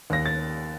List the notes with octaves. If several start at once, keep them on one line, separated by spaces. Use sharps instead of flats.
D#2 A#6
A6